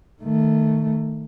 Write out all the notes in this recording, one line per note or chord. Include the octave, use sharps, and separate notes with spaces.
D#3 A3